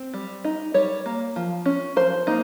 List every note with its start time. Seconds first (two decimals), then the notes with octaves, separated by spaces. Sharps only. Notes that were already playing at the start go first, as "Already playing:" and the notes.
Already playing: C4
0.14 G3
0.44 D#4
0.74 G3 C#5
1.06 A#3
1.36 F3
1.66 C#4
1.96 F3 C5
2.27 A#3 D#4